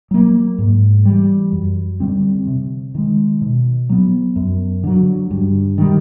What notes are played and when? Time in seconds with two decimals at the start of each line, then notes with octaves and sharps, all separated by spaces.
0.11 F#3 A#3
0.58 G#2
1.05 E3 G3
1.52 F#2
2.00 D3 G3 C4
2.47 C3
2.95 D#3 G#3
3.41 B2
3.89 F#3 B3
4.36 F#2
4.84 D3 F#3
5.31 G2
5.78 D#3 G3